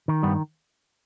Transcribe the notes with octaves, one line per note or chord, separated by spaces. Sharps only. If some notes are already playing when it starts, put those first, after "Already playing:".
D#3
G2 G3 B3